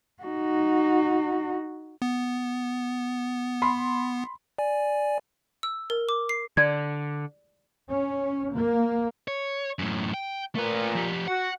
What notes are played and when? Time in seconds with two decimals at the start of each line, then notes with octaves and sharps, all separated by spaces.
0.23 D#4 F#4
2.02 B3
3.62 B5 C6
4.58 D5 G#5
5.63 E6
5.90 A#4
6.09 D6
6.29 C7
6.57 D3 D5 G#6
7.89 C#4
8.54 A#3
9.28 C#5
9.79 F#2 A2
10.14 G5
10.55 A#2 A3 B4
10.95 F3 G4
11.28 F#4 F#5